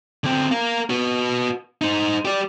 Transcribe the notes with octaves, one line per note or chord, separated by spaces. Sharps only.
D3 C4
A#4 F5
F#4 B4
D#4 C5
G4 D5